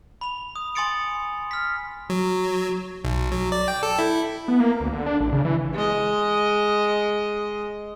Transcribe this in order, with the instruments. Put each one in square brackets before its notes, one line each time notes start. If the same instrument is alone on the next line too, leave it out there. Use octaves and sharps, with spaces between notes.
[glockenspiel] B5 F7
D#6
G#5 C6 D#6 A6 C#7 D7
F6 B6
[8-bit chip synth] F#3
B1
F#3
D5
G5
A4
E4
[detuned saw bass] B3
A#3
D2
D3
D4
A1
C#3
E3
[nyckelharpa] G#3 D#5